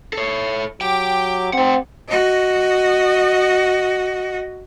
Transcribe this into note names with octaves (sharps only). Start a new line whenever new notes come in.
A4 C#5
F#3 G4 G5 D6
C4 C5 F#5
F#4 D#5